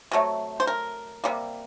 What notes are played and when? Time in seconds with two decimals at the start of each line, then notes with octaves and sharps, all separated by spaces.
0.12 C3 F#3 A3
0.60 C5
0.67 A#4
1.24 C3 G3 A#3